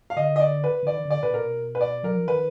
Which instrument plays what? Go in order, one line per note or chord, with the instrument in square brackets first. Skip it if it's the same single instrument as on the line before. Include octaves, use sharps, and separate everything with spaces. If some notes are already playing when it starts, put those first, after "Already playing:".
[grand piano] F5
[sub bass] D3 [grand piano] D#5
[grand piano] D#5
D5
B4
[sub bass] D3
[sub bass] D#3 [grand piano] D5
[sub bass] D3
[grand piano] D5
[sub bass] B2 [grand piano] B4
[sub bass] A#2 [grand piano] A#4
[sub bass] B2
[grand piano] B4
D5
[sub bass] F#3 [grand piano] A#4
[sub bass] F3
[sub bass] D#3 [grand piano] B4